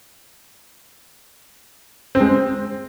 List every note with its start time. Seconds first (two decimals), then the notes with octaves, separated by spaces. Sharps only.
2.15 C4
2.20 G#3
2.26 C4